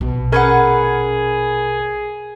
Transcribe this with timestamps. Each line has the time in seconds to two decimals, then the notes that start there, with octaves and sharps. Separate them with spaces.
0.01 A#1 B2
0.32 C#4 G#4 A#4 B4 F#5 G#6